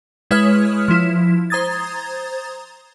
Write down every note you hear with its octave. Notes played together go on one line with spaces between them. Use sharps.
G#3 E4 B4 C#5 D#6 F6
F3 E4
C5 A#5 D#6 G#6 A6